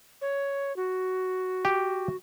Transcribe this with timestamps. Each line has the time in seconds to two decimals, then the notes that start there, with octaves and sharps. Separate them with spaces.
0.21 C#5
0.76 F#4
1.65 G4